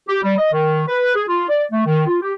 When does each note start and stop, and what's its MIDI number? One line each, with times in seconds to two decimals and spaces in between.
0.09 0.21 67
0.23 0.37 55
0.38 0.49 75
0.53 0.82 51
0.88 1.15 71
1.16 1.24 68
1.27 1.48 65
1.49 1.64 74
1.72 1.83 57
1.86 2.05 51
2.07 2.18 65
2.22 2.34 67